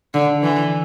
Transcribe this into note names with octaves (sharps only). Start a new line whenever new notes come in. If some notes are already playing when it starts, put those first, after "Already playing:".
D3
E3